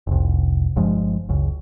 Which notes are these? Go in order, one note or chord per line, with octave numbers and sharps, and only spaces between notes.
F1 C2
G1 G2 F3 G#3
F#1 C#2